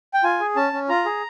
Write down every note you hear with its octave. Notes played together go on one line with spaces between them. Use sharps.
G5
F4 G#5
G#4
C#4 A5
C#4
F4 A#5
G#4